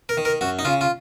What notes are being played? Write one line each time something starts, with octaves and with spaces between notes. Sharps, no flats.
A#4
D#3
A#4
F#2 F#4
D#4
C#3 F4
F4